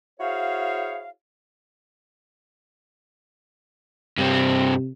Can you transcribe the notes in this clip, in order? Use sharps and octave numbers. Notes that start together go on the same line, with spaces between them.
E4 F#4 G#4 C5 C#5 F5
G2 C3 C4